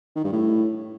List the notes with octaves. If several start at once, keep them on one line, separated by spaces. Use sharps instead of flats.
D#3
G2
A2